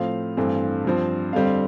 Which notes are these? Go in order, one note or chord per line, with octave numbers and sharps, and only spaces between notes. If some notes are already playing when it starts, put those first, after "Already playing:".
Already playing: A2 F3 C4 F5
G2 E3 A3 C4
G2 F3 C4
F2 D3 G3 C4 F5